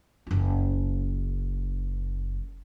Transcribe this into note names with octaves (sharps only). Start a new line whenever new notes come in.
F#1 F4